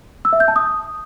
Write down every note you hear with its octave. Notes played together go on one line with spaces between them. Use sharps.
E6
E5
G6
A5
D#6